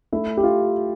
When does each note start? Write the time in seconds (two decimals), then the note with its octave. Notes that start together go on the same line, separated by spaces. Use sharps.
0.12 A3 E4
0.37 G4
0.43 F4